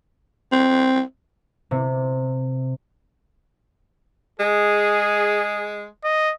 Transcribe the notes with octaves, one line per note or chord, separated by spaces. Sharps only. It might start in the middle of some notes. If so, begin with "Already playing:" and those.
C4
C3
G#3 G#4
D#5